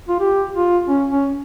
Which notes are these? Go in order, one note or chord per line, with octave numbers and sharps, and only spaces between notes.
F4
G4
F4
C#4
C#4